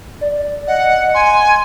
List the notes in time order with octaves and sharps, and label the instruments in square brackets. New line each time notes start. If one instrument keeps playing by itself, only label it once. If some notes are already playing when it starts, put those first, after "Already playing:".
[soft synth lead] D5
[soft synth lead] D#5 [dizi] F#5
[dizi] G#5 [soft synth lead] C6